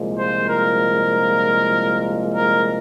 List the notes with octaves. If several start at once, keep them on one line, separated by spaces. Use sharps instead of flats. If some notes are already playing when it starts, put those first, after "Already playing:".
Already playing: C2 A#2 F3 G#3
C5
A#4
A#4